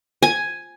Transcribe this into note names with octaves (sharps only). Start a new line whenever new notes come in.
G#5